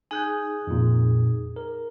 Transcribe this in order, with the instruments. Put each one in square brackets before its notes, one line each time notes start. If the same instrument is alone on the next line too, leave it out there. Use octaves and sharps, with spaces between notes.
[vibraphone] D#4 G#4 [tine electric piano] G#5 F#6 G6
[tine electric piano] F2 A#2
A#4